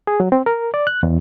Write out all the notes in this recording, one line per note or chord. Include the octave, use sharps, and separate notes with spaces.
G#4
F#3
C4
A#4
D5
F#6
E2